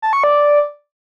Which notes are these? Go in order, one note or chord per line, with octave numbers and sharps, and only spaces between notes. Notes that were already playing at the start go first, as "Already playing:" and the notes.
A5
C#6
D5